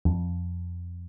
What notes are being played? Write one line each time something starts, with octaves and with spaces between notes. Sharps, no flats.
F2